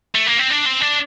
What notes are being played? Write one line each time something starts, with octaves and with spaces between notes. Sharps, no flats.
A3
A#3
C4
D4
C4
D4